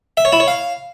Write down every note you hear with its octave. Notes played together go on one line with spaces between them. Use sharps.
E5
C#5
E4
C#5
F5